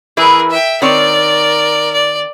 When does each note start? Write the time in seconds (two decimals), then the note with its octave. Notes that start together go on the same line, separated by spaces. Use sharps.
0.17 E3 E4 G#4 A#4 B4
0.51 E5 G5
0.82 D#3 C4 A#4 C#5 D5
1.94 D5